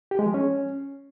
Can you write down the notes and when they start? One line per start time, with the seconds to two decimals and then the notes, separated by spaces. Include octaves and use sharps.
0.11 G4
0.19 G#3
0.27 F3
0.34 C#4